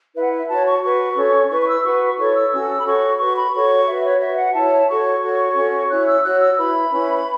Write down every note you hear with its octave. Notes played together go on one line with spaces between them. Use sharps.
E4 B4 E5
F#5
E5
F#4 C#5 A5
C#6
F#4 B4 C#6
C#4 A4 C#5
E4 B4 C#6
C#6
E6
F#4 B4 C#6
E4 A4 C#5 C#6
E6
C#4 F#4 A4 E6
B5
F#4 A4 C#5 C#6
F#4 B4 C#6
B5
F#4 A4 C#5 C#6
F#4 B4 E5
C#5
F#4 B4 E5
F#5
E4 C#5 A5
F#4 A4 C#5 C#6
F#4 A4 C#5
C#4 F#4 A4 C#5
C#4 E4 C#5 F#6
E6
F#4 C#5 F#6
E6
E4 B4 B5
C#4 E4 B4